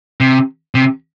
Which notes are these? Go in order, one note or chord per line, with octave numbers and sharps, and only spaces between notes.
C3
C3